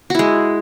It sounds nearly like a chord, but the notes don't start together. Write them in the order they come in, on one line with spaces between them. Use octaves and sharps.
F#4 E4 G#3